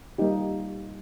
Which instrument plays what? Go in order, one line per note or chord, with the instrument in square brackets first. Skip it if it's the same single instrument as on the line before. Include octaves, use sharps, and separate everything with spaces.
[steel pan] G3 A#3 D#4 G4